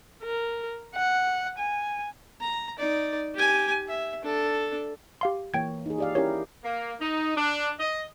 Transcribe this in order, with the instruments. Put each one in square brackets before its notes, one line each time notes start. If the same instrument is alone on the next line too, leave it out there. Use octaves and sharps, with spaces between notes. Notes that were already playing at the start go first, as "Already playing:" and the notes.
[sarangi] A#4
F#5
G#5
[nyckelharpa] A#5
D#4 D5
G4 G#5
E5
D4 A4
[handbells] G4 F5 C6
[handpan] E3 A#3 C#5 [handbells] G5 G#6
[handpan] D#4 G#4
G4 D5 F5
[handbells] C#4 C#5 [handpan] E4 G4 A#4
[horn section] A#3
D#4
D4
D#5